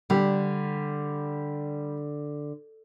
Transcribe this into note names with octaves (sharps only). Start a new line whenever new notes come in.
D3 G3 G4